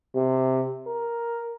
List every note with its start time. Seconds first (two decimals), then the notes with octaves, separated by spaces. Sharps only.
0.16 C3
0.87 A#4